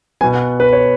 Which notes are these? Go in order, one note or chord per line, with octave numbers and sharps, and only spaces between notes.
B2 B3 G#5
F#5
B4
C#5